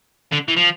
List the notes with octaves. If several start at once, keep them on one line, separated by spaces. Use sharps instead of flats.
D3
E3
F3